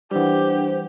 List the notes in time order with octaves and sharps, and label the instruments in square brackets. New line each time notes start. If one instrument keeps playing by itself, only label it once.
[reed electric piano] E3 G3 [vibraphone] D4 F#5 [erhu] G4 [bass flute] C5